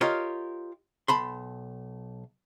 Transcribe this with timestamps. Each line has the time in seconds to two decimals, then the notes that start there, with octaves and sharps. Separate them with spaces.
0.01 F4 G4 A#4 C#5 D#5
1.08 B1 A5 B5 C6